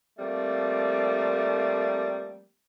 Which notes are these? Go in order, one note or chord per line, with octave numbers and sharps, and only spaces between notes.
F3 G3 A3 A#3 C4